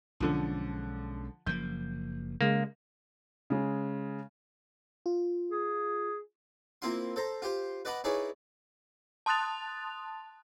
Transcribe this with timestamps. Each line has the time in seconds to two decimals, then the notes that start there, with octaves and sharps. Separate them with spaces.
0.20 B1 D3 F3 G#3 C#4
1.46 F#1 F3 A#3 G6
2.41 C#3 G#3 A#3
3.50 C#3 G#3
5.06 F4
5.51 G#4
6.82 A#3 C4 E4 F4 C6
7.16 A4 C5 A#5
7.42 F4 G4 C5
7.85 B4 D5 D#5 F#5 A#5 B5
8.04 D#4 E4 G#4 B4 C#5 D5
9.26 A5 C6 D#6 F#6 A6 F7